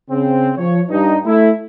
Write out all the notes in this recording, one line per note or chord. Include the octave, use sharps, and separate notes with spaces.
C#3 C4
F3 C#5
G2 D#4
A3 E4